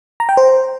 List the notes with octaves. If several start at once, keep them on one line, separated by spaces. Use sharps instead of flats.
A#5
G5
C5